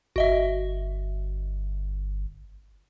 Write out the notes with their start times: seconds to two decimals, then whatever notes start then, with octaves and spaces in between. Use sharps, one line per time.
0.16 G1 F#4 D#5 E5